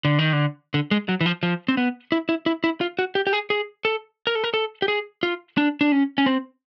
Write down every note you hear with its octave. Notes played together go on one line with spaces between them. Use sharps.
D3
D#3
D3
D3
G#3
F#3
E3
F3
F3
C4
B3
E4
E4
E4
E4
F4
F#4
G4
G4
G#4
G#4
A4
A#4
A4
A#4
A4
G4
G#4
F4
D4
D4
C#4
C#4
C4